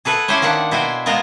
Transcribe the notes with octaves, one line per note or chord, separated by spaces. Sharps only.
G#4 A4 B4 E5 F#5
C#4 E4 G4 A4 C5 C#5
D#3 A#3 D4 F#5
B2 E4 C5 G5 G#5
G#3 B3 F4 A#4 C5